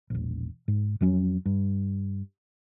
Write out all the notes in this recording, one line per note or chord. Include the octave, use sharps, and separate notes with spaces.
E1 A#1
G#2
F2 F#3 C#4
G2